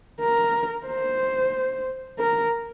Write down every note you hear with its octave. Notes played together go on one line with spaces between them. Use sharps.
A#4
C5
A#4